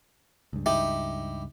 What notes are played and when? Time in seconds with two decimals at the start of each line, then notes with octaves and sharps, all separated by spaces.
0.53 C#2 G2
0.66 D#4 E4 G4